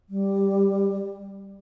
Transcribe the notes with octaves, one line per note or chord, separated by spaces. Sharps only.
G3